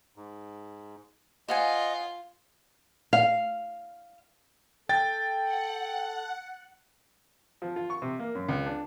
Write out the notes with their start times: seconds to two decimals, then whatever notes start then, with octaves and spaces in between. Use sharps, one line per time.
0.16 G#2
1.48 F4 C5 D#5 F#5 G#5
3.13 F5
4.89 A4 G5 A6
5.43 F#5
7.62 F3
7.76 F4
7.90 C#6
8.02 C3
8.19 A#3
8.35 F#2
8.49 C#2
8.66 D4